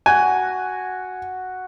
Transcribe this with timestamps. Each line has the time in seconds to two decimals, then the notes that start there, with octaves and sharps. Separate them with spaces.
0.06 F#4 F#5 G#5